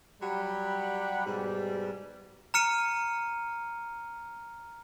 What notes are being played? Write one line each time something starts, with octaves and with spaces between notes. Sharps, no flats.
F#3 G3 G4 F#5 B5
G#2 B2 G3
A#5 F6 C#7 D#7